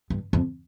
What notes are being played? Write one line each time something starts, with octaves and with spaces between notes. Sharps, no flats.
G2
F2